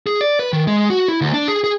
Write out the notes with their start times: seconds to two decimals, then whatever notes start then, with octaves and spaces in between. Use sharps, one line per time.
0.07 G#4
0.21 D5
0.39 B4
0.53 D#3
0.67 G#3
0.90 F#4
1.08 E4
1.21 D2
1.34 D4
1.48 G#4
1.64 G#4